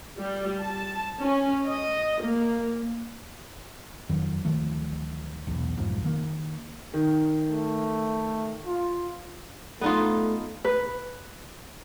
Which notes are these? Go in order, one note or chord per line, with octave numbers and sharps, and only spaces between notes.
G3
A5
C#4
D#5
A#3
F#1 F2 D#3 F#3
D1 D#3 F3 A3
E1 B1 E2
B1 F2 G#2 F3
D#3 A#3
D#3
A3
F4
A3 B3 D#4 F4
B4